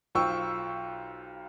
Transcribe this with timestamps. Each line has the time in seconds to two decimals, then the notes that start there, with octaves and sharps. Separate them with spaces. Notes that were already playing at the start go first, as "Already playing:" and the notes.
0.15 B1 F4 C5 G5 C#6 E6